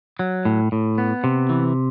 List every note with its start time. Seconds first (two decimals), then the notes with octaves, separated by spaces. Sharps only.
0.19 F#3
0.45 A2
0.72 A2
0.98 B3
1.24 C3
1.50 E3